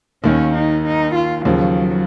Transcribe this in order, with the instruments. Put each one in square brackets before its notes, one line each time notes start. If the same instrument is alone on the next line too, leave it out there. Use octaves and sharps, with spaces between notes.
[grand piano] D#2 D#3 A#3 [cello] C#4
[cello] D#4
D#4
F4
[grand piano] D#2 C#3 F3 [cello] F#3